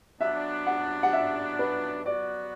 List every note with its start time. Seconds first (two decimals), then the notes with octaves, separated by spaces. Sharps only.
0.21 F#3 B3 D4 E5
0.67 F#5
1.03 F#5
1.13 E5
1.59 B4
2.05 F#3 B3 F#4 D5